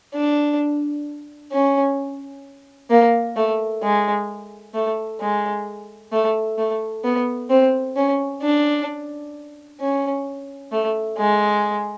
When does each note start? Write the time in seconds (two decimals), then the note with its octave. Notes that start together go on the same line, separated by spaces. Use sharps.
0.14 D4
1.52 C#4
2.90 A#3
3.36 A3
3.82 G#3
4.74 A3
5.20 G#3
6.12 A3
6.58 A3
7.04 B3
7.50 C4
7.96 C#4
8.42 D4
9.80 C#4
10.72 A3
11.18 G#3